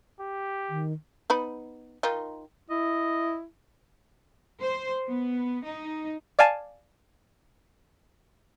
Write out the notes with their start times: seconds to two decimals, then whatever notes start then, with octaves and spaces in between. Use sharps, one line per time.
0.20 G4
0.69 D#3
1.30 B3 D#4 B5
2.03 D#3 D#4 F4
2.70 E4 D#5
4.60 C5
5.08 B3
5.65 D#4
6.39 D5 F5 G#5 A5